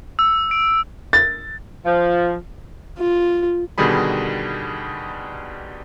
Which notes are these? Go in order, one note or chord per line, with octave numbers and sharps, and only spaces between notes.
E6
D7
A6
F3
F4
B2 D3 D#3 G3 G#4 B5